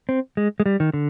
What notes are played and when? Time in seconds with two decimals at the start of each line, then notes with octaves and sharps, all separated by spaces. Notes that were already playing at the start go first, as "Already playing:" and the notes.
0.09 C4
0.37 G#3
0.60 G#3
0.66 G3
0.80 D#3
0.94 D3